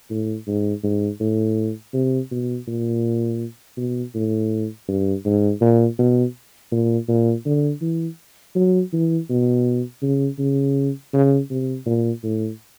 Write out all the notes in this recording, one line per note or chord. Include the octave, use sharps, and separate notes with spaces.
A2
G#2
G#2
A2
C3
B2
A#2
B2
A2
G2
G#2
A#2
B2
A#2
A#2
D3
E3
F#3
E3
B2
C#3
C#3
C#3
C3
A#2
A2